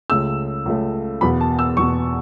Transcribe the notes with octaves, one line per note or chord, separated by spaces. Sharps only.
C#2 C#3 A3 E6
C#2 C#3 A3
E2 B2 B3 B5
A5
E6
E2 B2 B3 C#6